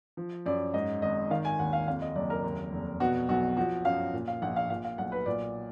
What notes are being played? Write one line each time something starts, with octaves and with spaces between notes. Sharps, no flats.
F3
F#2 D5
G#2 D#5
G#1 D#5
D#3 F5
G#5
D#2 F#5
F5
F2 F5
D#5
F#1 D5
A#4
D#2
F1
B2 F#4
B1 F#4
F3 F#4
F#2 F5
A#2
F5
A#1 F#5
F5
A#2 F5
F5
B1 F#5
B4
A#2 D5